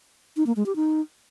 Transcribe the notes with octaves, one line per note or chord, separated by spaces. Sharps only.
D#4
A#3
G#3
G4
D#4